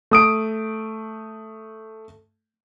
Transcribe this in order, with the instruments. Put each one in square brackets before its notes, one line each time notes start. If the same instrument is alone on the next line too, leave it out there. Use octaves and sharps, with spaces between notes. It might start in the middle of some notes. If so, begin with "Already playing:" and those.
[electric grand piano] A3 D#6 D7